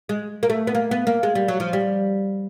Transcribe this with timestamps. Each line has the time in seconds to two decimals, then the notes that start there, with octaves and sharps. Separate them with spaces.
0.09 G#3
0.43 A#3
0.50 A3
0.67 B3
0.75 A#3
0.91 B3
1.07 A#3
1.23 G#3
1.35 G3
1.48 F#3
1.60 F3
1.73 G3